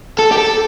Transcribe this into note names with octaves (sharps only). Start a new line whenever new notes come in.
A4
G4
A4